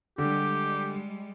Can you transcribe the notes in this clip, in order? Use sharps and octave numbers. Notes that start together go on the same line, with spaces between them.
D3 G3 G#3 G4